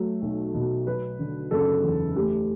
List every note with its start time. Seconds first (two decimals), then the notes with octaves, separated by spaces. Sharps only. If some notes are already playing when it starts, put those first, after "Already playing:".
Already playing: F#3 A3
0.22 B1
0.54 B2
0.87 F#3 B4
1.19 D3
1.51 F#1 A4
1.84 E2
2.16 A3 G4